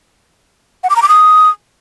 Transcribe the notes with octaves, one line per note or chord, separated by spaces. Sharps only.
F#5
D6
A#5
D6
D#6